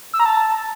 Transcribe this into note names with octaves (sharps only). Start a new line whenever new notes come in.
E6
A#5
A5